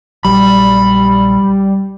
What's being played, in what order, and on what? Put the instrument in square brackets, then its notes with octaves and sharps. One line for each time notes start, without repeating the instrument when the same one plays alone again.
[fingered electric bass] A#1 F#3 [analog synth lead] G3 [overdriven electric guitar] B5